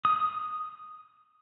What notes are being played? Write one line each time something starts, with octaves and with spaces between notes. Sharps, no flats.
D#6